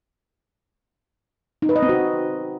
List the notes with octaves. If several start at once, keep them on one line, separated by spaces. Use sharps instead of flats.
D#4
B4
D#5
C4
F#4